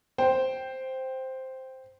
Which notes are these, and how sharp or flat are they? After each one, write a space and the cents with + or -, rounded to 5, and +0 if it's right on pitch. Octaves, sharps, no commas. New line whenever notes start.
C5 +0 G5 -5